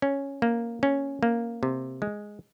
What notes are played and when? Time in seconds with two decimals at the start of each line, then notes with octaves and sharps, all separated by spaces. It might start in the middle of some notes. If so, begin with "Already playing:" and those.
0.02 C#4
0.42 A#3
0.83 C#4
1.23 A#3
1.63 C3
2.02 G#3